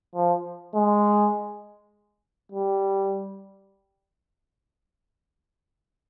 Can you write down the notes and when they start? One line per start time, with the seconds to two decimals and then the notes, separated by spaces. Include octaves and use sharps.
0.15 F3
0.75 G#3
2.52 G3